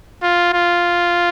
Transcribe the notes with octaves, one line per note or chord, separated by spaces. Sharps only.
F4
F4